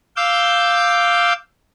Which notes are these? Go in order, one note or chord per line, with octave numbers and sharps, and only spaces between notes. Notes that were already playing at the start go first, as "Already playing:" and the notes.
F5 D6 E6 G6